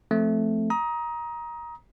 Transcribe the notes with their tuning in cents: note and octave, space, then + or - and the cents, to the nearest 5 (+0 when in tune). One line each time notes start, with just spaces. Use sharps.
F3 +0 A3 +0 C4 +0
A#5 +20 D#6 +20